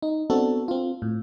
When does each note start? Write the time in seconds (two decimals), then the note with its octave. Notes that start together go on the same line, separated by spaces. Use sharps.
0.02 D#4
0.30 B3 C4 D4 F#4 A4
0.68 C4 F4
1.02 A2